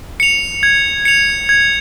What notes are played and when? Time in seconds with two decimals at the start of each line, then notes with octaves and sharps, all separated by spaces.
0.20 C#7 F7
0.63 G#6
1.05 C#7 F7
1.49 G#6